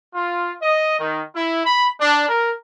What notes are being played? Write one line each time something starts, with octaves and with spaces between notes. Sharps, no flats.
F4
D#5
D#3
E4
B5
D4
A#4